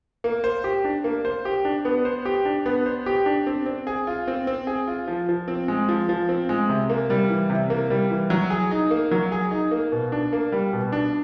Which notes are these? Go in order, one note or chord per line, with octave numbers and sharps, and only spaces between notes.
A#3
C5
G4
D4
A#3
C5
G4
D4
B3
C5
G4
D4
B3
C5
G4
D4
C4
C4
G#4
F4
C4
C4
G#4
F4
F3
F3
C4
G#3
F3
F3
C4
G#3
C3
A#3
G3
E3
C3
A#3
G3
E3
F#3
G#4
D#4
A#3
F#3
G#4
D#4
A#3
B2
D4
A#3
G3
B2
D4